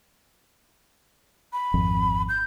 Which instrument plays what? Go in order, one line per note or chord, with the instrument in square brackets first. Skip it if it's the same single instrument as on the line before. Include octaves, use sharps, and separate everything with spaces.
[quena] B5
[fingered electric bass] G#1 F2
[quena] G6